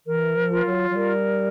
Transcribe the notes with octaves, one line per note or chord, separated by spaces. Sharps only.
E3 A#4
F3
F4
F#3
F#3
G3 A#4